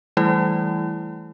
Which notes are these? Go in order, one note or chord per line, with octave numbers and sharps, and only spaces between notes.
E3 G3 A3 E4